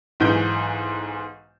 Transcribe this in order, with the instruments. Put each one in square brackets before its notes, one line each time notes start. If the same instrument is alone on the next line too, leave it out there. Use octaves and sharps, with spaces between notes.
[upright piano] B1 G#2 E3 G6